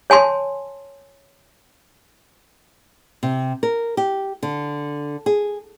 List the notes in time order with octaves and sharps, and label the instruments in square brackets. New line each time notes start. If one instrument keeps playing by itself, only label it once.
[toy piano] C#5 G#5 A5 C6
[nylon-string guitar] C3
A#4
G4
D3
G#4